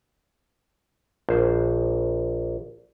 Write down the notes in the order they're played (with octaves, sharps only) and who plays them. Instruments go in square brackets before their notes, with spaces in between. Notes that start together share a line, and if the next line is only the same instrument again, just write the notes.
[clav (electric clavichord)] A#1 C5